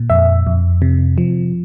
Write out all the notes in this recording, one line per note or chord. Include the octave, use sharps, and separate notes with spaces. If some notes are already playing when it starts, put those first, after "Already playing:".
Already playing: A#2
F2 E5
F2
C3
F3